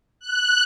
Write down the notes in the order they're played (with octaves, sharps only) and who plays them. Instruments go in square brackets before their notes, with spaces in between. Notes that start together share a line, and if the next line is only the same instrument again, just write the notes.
[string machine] F#6